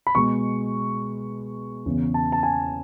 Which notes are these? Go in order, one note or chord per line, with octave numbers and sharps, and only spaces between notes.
B5
B2 G#3 C#6
E2 C#3 E3
A5
A5
G#5